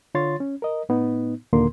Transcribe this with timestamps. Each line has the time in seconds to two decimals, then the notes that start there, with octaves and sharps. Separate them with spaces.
0.15 D3 F4 C#5 C6 A6
0.40 C#4
0.62 A#4 D#5
0.89 A2 B3 D#4
1.53 D#2 A#2 D3 A#3 A#4 C6